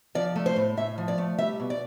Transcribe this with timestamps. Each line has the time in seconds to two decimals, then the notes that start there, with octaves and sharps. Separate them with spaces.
0.15 F3 D5
0.36 A3
0.46 C5
0.56 A2
0.77 A2 E5
0.98 F3
1.08 D5
1.18 A3
1.39 G3 E5
1.60 B2
1.70 D5